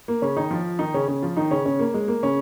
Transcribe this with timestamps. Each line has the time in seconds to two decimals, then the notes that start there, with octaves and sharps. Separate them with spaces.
0.08 A#3
0.22 C#3 C#4
0.36 D#3 D#4
0.51 F3 F4
0.79 D#3 D#4
0.94 C#3 C#4
1.08 C#3 C#4
1.22 F3 F4
1.37 D#3 D#4
1.51 C#3 C#4
1.66 C#3 C#4
1.79 A#3
1.94 G#3
2.08 A#3
2.23 C#3 C#4